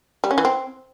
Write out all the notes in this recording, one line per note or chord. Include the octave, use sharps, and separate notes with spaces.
G3
C#4
E3
C4